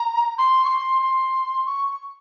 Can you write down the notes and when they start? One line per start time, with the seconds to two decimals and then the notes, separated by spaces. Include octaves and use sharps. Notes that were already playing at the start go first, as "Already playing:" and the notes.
Already playing: A#5
0.38 C6
0.65 C#6
0.70 C6
1.02 C6
1.66 C#6